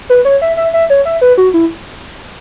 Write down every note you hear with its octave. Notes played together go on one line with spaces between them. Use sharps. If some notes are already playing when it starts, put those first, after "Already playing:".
B4
C#5
E5
E5
E5
C#5
E5
B4
F#4
E4